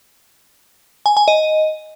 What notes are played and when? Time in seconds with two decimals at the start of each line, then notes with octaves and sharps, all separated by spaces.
1.06 G#5
1.17 G#5
1.28 D#5